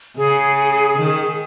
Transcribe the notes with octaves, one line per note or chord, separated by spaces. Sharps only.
C#3 G#4
D#3